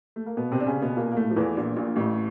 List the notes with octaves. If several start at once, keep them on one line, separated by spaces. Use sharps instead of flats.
A3
A#3
B2 B3
C3 C4
D4
C#3 C#4
B2 B3
A#2 A#3
A#3
A2 A3
F3
E2 E3
A#1 A#2
A#1 A#2
A1 A2